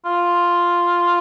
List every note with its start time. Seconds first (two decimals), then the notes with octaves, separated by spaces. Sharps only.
0.05 F4